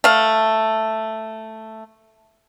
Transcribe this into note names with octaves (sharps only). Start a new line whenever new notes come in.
A3 F5